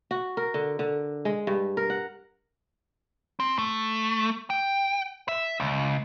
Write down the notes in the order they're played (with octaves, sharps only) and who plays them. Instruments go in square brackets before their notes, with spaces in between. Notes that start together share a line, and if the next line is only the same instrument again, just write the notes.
[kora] F#4
A#4
D3
D3
G#3
G2
A#4
F#5
[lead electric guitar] C4
A3
G5
E5
C#2